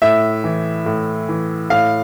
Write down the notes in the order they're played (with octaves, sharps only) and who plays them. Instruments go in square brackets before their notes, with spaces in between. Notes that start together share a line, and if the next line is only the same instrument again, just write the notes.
[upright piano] A2 E5
E3
A2
E3
A2 F5